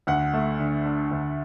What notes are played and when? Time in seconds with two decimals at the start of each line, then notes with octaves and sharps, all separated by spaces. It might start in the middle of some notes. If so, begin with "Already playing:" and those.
0.07 D2 F#5
0.34 A3
0.60 D3
0.85 D4
1.11 D2